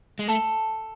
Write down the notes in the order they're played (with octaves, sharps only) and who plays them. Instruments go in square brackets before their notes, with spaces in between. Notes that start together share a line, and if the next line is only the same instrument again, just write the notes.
[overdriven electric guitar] G#3
[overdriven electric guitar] A3 [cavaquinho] A4